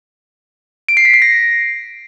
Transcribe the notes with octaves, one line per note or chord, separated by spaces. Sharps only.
D7
C7
B6
C7
A#6